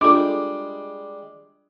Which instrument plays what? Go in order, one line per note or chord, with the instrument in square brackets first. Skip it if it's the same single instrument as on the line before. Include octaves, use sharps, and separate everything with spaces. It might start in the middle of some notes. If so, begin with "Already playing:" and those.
[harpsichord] G3 G#3 [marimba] D4 F4 A4 [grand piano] D6